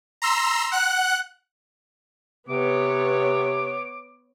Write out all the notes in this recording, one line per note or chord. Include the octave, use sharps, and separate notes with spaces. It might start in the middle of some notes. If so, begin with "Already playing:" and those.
A#5 C6 E6
F#5 F#6
C3 B3 C#5 D6